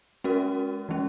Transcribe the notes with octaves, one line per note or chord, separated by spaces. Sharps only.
G#3 C#4 F#4 A#4
E3 G#3 C#4